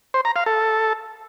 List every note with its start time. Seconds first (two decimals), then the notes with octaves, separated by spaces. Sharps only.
0.14 C5
0.25 A#5
0.36 F5
0.46 A4